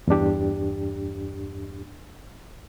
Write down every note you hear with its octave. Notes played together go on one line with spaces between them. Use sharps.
E2 G2 D4 G4